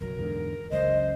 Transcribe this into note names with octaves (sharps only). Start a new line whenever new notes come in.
F#1 B1 F#3 A#4
E2 G#2 D3
F#1 C#2 F#2 C5 D#5